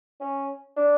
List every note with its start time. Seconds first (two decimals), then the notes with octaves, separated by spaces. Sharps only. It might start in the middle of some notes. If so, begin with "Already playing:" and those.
0.20 C#4
0.77 D4